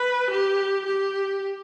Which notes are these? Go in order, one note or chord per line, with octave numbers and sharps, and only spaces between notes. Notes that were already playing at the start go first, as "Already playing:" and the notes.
Already playing: B4
G4
G4